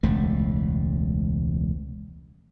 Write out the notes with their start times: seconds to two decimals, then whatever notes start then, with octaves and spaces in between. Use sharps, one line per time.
0.03 E1 C#2 A3